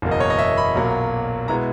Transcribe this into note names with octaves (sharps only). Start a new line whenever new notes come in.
F#1 E2 B2 A#3
D#5
C#5
D#5
E5
B5
B1 A#2 F#3 A#3
B2 G#3 B3 E4 A#5